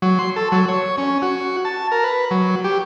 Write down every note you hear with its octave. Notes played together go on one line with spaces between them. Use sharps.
F#3
C6
A4
F#3
C#5
C#4
F#4
A5
A#4
B4
F#3
G4